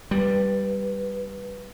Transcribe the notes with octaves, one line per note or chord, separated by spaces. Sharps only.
G3 B4